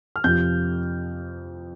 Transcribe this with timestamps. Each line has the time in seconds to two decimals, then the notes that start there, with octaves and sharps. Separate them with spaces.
0.16 F6
0.24 F2 C3 F3 G6